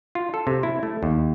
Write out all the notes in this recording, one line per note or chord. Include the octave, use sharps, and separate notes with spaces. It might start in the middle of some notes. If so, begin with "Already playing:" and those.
F4
A4
C3
E4
A3
D#2